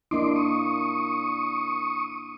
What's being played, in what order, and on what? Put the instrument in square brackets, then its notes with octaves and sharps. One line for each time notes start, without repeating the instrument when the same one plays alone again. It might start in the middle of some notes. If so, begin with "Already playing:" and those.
[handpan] A#3 D4 E4 [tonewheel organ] D#5 C6 D6
[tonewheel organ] C#6 D#6